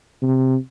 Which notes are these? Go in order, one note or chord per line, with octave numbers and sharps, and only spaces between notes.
C3